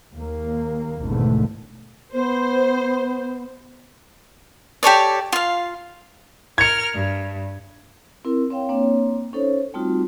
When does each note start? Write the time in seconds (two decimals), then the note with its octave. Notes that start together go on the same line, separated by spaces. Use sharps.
0.13 D#2 A#3
1.02 G#1 E2 B2 D3 A3
2.13 B3 C5
4.83 G4 A4 C#5 D5
5.32 F4 F5
6.58 A#4 F6 G#6 C#7
6.94 G2
8.25 C4 E4 A#4
8.50 C4 C#5 F5 G5
8.69 A#3 C4 D4 C#5
9.33 C#4 D#4 A4 C5 C#5
9.74 G3 A3 C4 D#4 F4 F#4